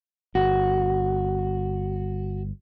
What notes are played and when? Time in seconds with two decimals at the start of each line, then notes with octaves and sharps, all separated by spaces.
0.35 G1 F#4